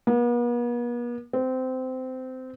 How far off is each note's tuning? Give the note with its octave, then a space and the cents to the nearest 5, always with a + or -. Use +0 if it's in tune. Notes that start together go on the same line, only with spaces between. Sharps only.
B3 -45
C4 -20